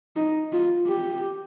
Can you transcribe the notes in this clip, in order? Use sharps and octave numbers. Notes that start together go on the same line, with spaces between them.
D#4
F4
G4